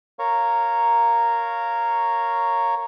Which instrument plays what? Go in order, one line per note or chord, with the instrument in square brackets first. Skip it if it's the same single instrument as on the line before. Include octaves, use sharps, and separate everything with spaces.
[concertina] A#4 C#5 F5 A#5 C#6